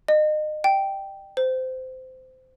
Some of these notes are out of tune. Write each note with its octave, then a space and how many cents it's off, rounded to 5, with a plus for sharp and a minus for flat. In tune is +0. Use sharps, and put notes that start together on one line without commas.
D#5 -30
G5 -5
C5 -20